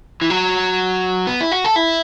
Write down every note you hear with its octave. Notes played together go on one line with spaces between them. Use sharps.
E3
F#3
B3
E4
F#4
A4
E4